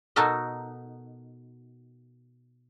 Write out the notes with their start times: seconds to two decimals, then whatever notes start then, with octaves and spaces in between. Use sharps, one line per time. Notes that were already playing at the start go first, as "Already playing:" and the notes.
0.16 B2 D#4 F#4 A4 A#4 D#5